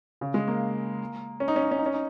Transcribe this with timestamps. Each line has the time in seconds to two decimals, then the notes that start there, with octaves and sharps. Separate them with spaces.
0.21 C#3
0.34 G#3
0.48 A#3
1.40 C#4
1.48 D#4
1.56 C#4
1.63 D#4
1.71 C#4
1.78 D#4
1.86 C#4
1.94 D#4